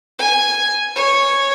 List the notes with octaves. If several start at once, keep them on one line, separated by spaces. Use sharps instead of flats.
G#5
C#5